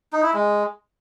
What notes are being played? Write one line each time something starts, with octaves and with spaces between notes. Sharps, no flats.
D#4
E4
G#3